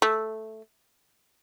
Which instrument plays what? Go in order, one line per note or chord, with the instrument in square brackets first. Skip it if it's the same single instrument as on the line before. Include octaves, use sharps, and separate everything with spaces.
[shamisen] A3